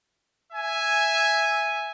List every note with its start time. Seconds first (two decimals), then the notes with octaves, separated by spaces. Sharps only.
0.53 E5 G#5